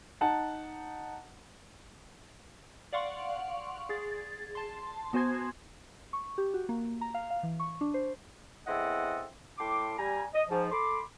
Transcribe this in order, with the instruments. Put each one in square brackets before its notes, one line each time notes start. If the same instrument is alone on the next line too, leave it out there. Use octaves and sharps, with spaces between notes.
[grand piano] D#4 F#5 A5
[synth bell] D5 F5 F#5 C6 C#6
G#4 A6
A5 C6
B3 F#4 C5 G#5 C6 G#6
C#6
G4
F#4
A#3
A#5
F5
F5
E3
C#6
D4
C5
[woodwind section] E2 C4 E4 A4 D#5 F#5
A2 G5 A5 C6 D6
G3 G#5 A#5
D#5
G#2 F3
A4 B5 C6 D6